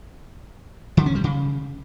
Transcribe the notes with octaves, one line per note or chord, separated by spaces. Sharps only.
D3
C#4
G3
C#3